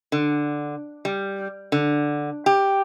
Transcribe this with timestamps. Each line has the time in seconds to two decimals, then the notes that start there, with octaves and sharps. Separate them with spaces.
0.12 D3
1.05 G3
1.72 D3
2.46 G4